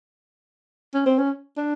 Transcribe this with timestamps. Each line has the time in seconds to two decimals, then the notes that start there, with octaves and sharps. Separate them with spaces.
0.94 C#4
1.06 C4
1.19 C#4
1.57 D4